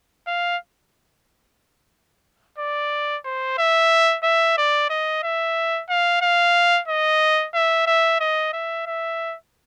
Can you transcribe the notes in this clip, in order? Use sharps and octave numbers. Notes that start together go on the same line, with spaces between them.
F5
D5
C5
E5
E5
D5
D#5
E5
F5
F5
D#5
E5
E5
D#5
E5
E5